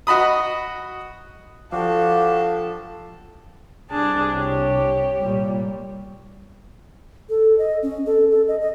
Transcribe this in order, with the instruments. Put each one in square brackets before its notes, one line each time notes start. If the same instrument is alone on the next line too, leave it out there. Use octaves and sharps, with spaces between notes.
[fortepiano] F#4 D#5 B5 D#6
[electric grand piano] F3 [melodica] D4 F#4 G4 [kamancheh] A4 [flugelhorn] F5
[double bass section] C2 [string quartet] D4 G#4 A5
[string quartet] G4 C#5
[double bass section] A#2 G3
[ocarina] A4
D#5
C#4
A4
A4
D#5
D#5